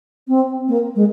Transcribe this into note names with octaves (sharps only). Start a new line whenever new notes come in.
C4
A#3
G#3